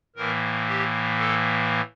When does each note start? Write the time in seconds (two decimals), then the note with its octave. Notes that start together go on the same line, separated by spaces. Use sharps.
0.16 A2 E3 A#3 A#4
0.68 G4
1.19 A4